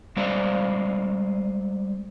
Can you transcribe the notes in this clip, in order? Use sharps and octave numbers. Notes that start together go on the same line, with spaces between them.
G3 G#3 C4 C5 D5 F5